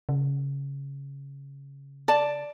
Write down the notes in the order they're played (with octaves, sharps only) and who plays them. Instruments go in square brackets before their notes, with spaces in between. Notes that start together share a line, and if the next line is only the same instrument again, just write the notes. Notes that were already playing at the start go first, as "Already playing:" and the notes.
[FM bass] C#3
[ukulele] D5 A5